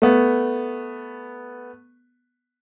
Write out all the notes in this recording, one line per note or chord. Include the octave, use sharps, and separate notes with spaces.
A3 B3